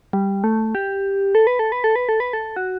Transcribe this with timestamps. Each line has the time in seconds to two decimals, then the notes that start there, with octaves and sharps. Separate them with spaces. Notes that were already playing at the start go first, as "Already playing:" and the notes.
0.13 G3
0.44 A3
0.75 G4
1.35 A4
1.47 B4
1.59 A4
1.72 B4
1.84 A4
1.95 B4
2.09 A4
2.20 B4
2.33 A4
2.56 F#4